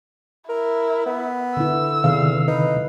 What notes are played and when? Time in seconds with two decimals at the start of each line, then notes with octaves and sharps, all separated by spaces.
0.49 E4 A#4
1.06 B3
1.57 D3 E4 E6
2.04 E2 C3 D#3 F5
2.48 D#4 B4